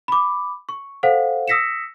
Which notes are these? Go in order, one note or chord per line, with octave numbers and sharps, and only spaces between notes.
B5 D6
C#6
A4 C5 F5 F#5
D#6 E6 A#6 B6 C#7 E7